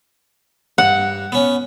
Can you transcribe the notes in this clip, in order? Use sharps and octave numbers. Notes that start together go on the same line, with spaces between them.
G2 F#5
B3 C#4